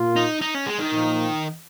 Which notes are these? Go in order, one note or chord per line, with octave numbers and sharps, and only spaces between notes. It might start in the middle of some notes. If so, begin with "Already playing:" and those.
Already playing: A#2 A#3 F4
D#4
D#4
C#4
G#3
D#3
A#2 F3 A#3 D#4